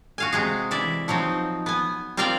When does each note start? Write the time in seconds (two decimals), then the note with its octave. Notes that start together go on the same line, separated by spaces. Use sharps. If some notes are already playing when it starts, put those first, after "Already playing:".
0.18 F#4 F5 G#5
0.33 C3 G#3 G#4
0.71 E3 D5 E5
1.08 F3 F#3 C4 D#4
1.66 B3 G#5
2.17 C4 F4 A#4 D5 F5 G5